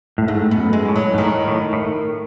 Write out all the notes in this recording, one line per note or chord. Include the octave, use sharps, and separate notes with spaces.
A2
G#2 A3
B3
F#2
G#3
A2
F#3
G#2
A2 D#3
A2
A2